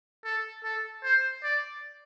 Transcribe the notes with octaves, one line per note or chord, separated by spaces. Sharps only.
A4
A4
C5
D5